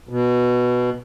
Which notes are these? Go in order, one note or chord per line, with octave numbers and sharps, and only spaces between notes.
B2